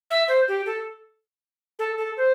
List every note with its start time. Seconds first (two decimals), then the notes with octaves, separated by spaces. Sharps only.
0.11 E5
0.28 C5
0.48 G4
0.66 A4
1.79 A4
1.98 A4
2.17 C5